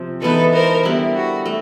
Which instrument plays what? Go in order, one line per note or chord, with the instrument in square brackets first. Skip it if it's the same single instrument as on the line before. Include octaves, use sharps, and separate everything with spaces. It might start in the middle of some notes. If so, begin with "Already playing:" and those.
Already playing: [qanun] C3 F3 C4
[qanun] E3 G#3 B3 D#4 [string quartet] A4 B4
[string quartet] A#4 C5
[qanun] D3 G3 B3 E4
[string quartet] F#4
[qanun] A3